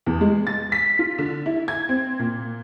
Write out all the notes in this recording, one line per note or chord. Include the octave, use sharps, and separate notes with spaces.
E2
G#3
A6
B6
F4
D3
E4
G#6
C4
A#2